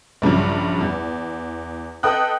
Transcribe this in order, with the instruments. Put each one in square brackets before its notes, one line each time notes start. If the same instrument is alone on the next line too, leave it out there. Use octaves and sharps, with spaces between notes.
[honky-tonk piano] A#1 G2 C#3 F#3
E2
A4 B4 D#5 G5 D#6 F#6